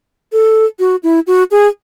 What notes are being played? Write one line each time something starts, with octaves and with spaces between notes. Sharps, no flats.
A4
F#4
E4
F#4
G#4